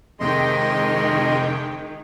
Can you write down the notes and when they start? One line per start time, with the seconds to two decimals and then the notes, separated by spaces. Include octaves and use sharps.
0.20 F2 C3 D#3 G#3 D#5 G5 C6